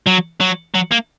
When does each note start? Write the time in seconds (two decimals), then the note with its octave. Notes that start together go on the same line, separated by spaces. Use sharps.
0.07 F#3
0.41 F#3
0.75 F#3
0.92 A#3